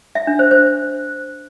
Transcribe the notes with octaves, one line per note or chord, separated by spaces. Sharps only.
E5
D4
C5
C5